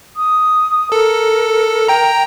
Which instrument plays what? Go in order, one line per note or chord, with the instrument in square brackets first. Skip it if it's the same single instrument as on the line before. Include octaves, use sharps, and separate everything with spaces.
[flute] D#6
[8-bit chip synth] A4 [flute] A#4
[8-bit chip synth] G5 A#5